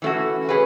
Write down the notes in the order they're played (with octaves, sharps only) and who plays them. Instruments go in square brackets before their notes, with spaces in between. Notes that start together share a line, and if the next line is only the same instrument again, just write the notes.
[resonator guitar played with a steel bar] E3 A3 C#4 F#4
C#4 G#4 B4